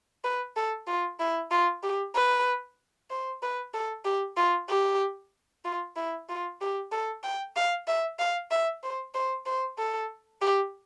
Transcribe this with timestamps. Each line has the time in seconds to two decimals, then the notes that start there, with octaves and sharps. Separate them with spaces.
0.24 B4
0.56 A4
0.87 F4
1.20 E4
1.51 F4
1.83 G4
2.15 B4
3.10 C5
3.42 B4
3.74 A4
4.05 G4
4.37 F4
4.69 G4
5.65 F4
5.96 E4
6.29 F4
6.61 G4
6.92 A4
7.23 G5
7.56 F5
7.87 E5
8.20 F5
8.51 E5
8.83 C5
9.14 C5
9.46 C5
9.78 A4
10.42 G4